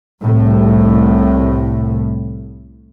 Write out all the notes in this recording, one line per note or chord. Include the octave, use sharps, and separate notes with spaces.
C2 A2